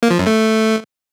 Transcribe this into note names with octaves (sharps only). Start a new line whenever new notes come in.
A#3
F3
F#2
A3